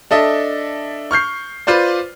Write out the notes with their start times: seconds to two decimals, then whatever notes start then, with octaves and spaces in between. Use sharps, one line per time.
0.11 D4 A4 D#5 E5
1.11 C#6 F6 G6 C7
1.67 F4 B4 C5 D5